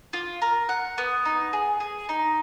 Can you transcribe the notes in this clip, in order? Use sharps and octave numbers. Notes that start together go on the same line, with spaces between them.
F4
A#4
F#5
B3
D#4
G#4
G#4
D#4